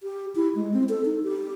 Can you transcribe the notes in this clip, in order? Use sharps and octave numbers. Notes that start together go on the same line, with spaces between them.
G4
E4
G#3
C4
A4
D#4
G4